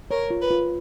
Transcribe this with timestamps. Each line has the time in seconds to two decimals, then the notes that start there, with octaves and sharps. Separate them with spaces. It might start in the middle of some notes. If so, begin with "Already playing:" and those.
0.11 A#4 C#5
0.30 F4
0.41 B4
0.51 F4